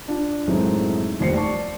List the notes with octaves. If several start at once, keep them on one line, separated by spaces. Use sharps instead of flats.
D4 F4
F#2 A2 D#3 G#3 A3 C4
F1 D#2 G3 C5 C7 C#7
D5 A5 C#6